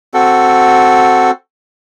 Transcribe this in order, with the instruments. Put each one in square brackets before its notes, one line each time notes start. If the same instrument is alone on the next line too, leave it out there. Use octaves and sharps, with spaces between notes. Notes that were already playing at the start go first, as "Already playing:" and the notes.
[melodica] C4 F#4 A4